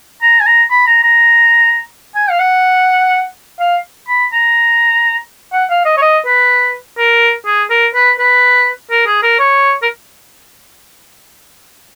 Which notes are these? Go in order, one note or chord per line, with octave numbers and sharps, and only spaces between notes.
A#5
G#5
A#5
B5
A#5
A#5
G#5
F5
F#5
F5
B5
A#5
F#5
F5
D#5
C#5
D#5
B4
A#4
G#4
A#4
B4
B4
A#4
G#4
A#4
C#5
A#4